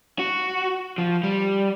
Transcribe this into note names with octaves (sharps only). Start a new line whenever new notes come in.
F#4
F3
G3